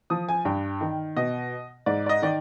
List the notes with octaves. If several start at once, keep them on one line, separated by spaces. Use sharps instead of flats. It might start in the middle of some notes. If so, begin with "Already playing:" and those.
F3 D#6
G#5
G2 G5
D#3
B2 D#5
G#2 D5
D5
D#5
D#3 D5